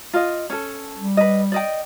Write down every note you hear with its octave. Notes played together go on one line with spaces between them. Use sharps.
F4 D#5
C#4 A4
G3
B4 D#5
D5 D#5 G5